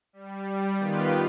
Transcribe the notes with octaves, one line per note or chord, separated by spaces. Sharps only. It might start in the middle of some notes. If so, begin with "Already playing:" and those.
G3
D#3 B3 F4 G4 B4